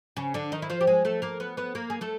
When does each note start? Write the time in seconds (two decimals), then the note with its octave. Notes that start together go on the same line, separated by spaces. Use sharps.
0.17 C#3 C#4
0.34 D3 D4
0.52 D#3 D#4
0.62 E4
0.70 F3 F4
0.81 G4
0.87 G#3 G#4
1.05 A3 A4
1.22 A#3 A#4
1.40 B3 B4
1.57 B3 B4
1.75 A#3 A#4
1.90 G#4
2.01 A3 A4